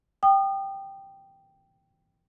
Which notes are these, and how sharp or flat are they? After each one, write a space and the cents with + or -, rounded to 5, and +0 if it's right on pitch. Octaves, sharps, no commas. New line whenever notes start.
G5 +0 D#6 -30